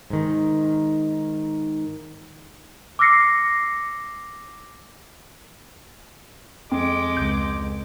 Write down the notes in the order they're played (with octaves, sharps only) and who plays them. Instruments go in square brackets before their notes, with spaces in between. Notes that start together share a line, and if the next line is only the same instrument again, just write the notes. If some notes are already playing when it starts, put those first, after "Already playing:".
[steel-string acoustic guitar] G#2 D#3
[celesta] D6 E6 F6 A#6 C7 C#7
[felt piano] F2 [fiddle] G#3 D6 [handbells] C4
[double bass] C#2 [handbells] G6